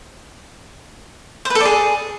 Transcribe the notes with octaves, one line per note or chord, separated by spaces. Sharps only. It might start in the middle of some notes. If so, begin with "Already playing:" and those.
C5
B4
A4
D5
G#4